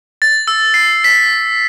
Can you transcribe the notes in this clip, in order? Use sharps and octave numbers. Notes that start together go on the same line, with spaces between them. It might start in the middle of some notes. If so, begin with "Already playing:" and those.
A6
E6
C7
B6